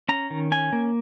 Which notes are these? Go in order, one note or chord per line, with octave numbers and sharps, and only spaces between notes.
C#4 A#5
D#3
C#4 G#5
A#3